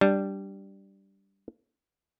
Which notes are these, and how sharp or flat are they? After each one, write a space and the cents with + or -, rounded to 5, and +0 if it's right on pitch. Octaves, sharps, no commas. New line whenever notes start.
G3 -5 D4 +0